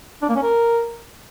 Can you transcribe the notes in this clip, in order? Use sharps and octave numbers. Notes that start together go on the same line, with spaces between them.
D4
A#3
C#4
A#4